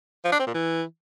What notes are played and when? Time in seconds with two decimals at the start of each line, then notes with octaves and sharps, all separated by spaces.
0.25 F3
0.32 D4
0.39 C4
0.47 A#2
0.54 E3